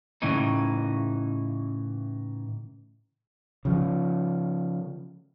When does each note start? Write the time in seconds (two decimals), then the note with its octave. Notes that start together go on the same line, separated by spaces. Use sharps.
0.22 A2 C#3 E3 D#4
3.65 C#3 F3